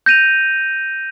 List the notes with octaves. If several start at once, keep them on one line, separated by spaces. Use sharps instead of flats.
G6 A#6 D#7 F7